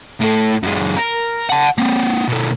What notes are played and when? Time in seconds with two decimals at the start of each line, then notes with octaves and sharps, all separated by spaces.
0.20 A2 A4
0.63 F#2 G#3
0.97 A#4
1.50 F#5 A5
1.78 A#3 C4
2.28 B2 A3